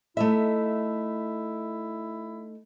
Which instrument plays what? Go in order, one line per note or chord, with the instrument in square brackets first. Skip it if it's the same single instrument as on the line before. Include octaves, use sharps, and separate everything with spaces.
[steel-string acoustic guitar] A3 D#4 E5 [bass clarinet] E4